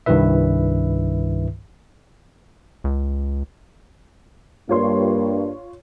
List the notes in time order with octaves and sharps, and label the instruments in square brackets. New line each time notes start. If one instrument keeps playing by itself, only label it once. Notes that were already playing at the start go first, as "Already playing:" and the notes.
[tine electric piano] C2 G2 D#3 E4 B4 E5
[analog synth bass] C#2
[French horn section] G2 A#3 D4 [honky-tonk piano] F4 C#5 C6